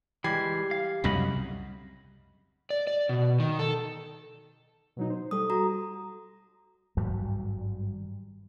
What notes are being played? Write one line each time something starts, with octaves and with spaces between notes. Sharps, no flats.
E3 G3 G#3 G4 G#6 C7
F5
C2 F#2 C#3 F#3 D#5 B5
D5
D5
B2
D#3
A4
B2 F#3 D#4
C5
G3 A4 D#6
F#4 A#5
G#1 G2 F#3 G3